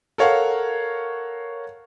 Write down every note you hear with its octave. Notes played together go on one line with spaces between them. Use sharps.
A4 A#4 C#5 F5 F#5